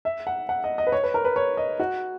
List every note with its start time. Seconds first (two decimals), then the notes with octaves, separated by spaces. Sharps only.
0.05 E5
0.27 F#5
0.49 F#5
0.64 D#5
0.78 D#5
0.87 B4
0.92 C#5
1.04 B4
1.14 A#4
1.25 B4
1.36 C#5
1.57 D#5
1.80 F#4